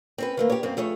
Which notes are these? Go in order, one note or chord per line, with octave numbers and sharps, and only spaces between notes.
C4 C#4 B4
D#3 A3 A#3
G4 C#5
F#2 A#3 C4
F2 A3 G#4 C#5